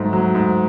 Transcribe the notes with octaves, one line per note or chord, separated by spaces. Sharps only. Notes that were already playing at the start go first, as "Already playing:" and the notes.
Already playing: G#2 F#3 A3
F#3
G#2